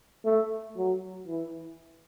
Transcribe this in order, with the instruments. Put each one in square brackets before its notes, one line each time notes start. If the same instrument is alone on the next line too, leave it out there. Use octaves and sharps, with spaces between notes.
[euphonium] A3
F#3
E3